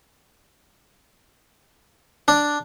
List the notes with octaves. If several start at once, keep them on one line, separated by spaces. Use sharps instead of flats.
D4